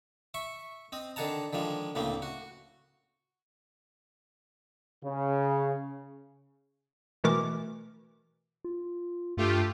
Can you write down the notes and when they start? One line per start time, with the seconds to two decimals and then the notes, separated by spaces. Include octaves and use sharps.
0.34 E5 C#6
0.92 C4 D#5
1.16 D3 D#3 G#4 F#5 A5 A#5
1.53 D3 D#3 F3 G#3
1.95 D2 A2 C#3 A#3 C4
2.22 F#4
5.03 C#3
7.24 B2 E3 A3 A#4 D6
8.64 F4
9.37 G2 A3 F4 G4